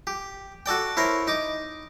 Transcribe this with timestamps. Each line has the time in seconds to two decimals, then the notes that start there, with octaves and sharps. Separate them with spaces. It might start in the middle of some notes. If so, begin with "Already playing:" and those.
0.07 G4
0.66 F#4 A4 D5 G5
0.97 E4 A#4 C5 C#5
1.27 D#4 D6